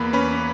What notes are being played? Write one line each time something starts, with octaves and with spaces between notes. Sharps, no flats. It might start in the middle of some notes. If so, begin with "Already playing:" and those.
Already playing: E2 A#3 B4 B5
C#4 B4 B5